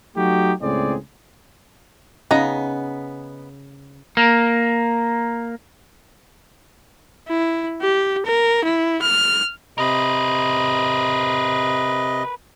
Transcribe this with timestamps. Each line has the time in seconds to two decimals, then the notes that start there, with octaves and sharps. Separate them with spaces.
0.16 F#3 A3 D#4 F#4 G4
0.61 C#2 A2 C4 G#4 D5
2.31 C#3 B3 D#4 A#5
4.17 A#3
7.28 E4
7.82 G4
8.26 A#4
8.64 E4
9.02 F6
9.78 C3 A#4 B4 D#5